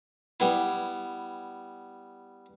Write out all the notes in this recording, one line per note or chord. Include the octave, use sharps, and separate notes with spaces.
G3 B3 E4